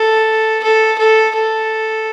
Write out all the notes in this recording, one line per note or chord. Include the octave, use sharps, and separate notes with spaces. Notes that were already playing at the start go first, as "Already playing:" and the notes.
Already playing: A4
A4
A4
A4